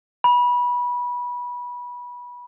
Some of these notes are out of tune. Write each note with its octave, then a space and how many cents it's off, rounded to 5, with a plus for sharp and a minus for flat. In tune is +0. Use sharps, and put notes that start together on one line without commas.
B5 -20